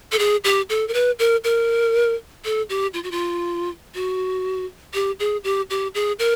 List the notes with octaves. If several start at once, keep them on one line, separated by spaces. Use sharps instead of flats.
A4
G#4
G4
A4
A#4
B4
A#4
A#4
A4
G4
F4
F#4
F4
F#4
G4
G#4
G4
G4
G#4
A#4